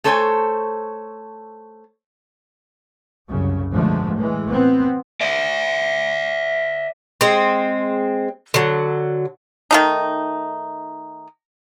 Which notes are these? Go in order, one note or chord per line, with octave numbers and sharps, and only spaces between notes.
A3 A4 C5 C#5 F#5 G#5
C2 F#2 C#3
G#2 B2 D3 F3 G#3 A3
A2 E3 G#3
B3 C4
D5 E5
G#3 C4
D3 F#3
D#3 A3 D#4